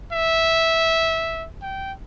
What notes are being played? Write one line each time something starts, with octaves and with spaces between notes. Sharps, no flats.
E5
G5